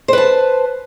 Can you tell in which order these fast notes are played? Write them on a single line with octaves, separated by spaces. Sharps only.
C5 B4 A5